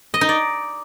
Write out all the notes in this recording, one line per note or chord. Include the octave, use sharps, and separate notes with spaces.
D#5
D#4
D5